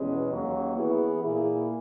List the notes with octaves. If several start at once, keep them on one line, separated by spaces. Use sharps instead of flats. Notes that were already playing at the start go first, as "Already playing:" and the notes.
Already playing: E2 B2 G#3 C#4
D#2 D#3 F#3 A#3 C#4
E3 B3 E4 G#4
A#2 A#3 E4 G#4